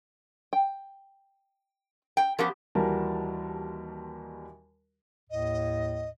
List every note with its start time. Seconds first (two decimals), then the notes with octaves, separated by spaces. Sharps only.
0.53 G5
2.17 G5
2.39 F3 B3 C#4 G4 A#4
2.75 D#2 E3 G3 F#4 A#4 A5
5.30 D#2 A2 D#5